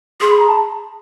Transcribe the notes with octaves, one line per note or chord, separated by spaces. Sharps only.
G#4 C6
B5
A#5
A5